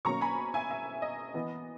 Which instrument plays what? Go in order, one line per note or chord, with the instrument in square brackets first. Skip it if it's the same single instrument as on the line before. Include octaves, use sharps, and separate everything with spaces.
[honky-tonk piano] B2 F#3 A#3 C#4 A#5 C#6
G#5 B5
E5 G#5
E5
D#5
E3 B3